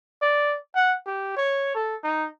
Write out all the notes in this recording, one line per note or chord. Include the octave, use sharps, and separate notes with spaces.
D5
F#5
G4
C#5
A4
D#4